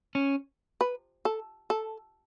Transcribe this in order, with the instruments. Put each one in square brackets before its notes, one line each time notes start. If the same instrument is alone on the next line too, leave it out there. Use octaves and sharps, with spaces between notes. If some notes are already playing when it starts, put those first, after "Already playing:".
[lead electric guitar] C#4
[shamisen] B4
A4
A4